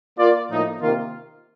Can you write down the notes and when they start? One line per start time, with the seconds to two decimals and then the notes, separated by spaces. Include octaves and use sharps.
0.18 A#3 F4 A#4 D5
0.51 A2 F3 A#3 D#4
0.82 C3 D#3 A#3 F4